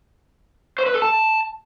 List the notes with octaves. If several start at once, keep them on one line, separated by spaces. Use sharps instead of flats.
C5
B4
A4
A5